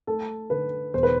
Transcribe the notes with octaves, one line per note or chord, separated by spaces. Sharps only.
A3 A4
D3 B4
E1 C5
B4